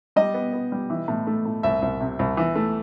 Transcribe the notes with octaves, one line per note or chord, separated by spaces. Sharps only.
G3 D#5
B3
B3
G3
E3
A2
A3
A2
C2 E5
C2
C3
C2
E3
A3